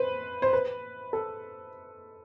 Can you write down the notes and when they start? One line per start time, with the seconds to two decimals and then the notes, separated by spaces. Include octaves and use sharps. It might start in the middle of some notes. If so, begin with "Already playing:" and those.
Already playing: B4 C5
0.42 C5
0.53 B4
1.13 A4